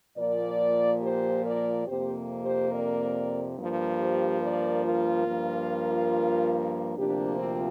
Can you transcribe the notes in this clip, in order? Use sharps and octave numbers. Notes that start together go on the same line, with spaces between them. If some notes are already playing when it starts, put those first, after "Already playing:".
A#2 F3 A#3 A#4 D5
G4 C5
A#4 D5
F2 C3 A#3 G4 C5
G4 C5
A#4 D5
G2 F3 A#3
G4 C5
A#4 D5
F4 A#4
G2 F3 A#3
D2 C3 F3 A#3 D4 G4
C4 F4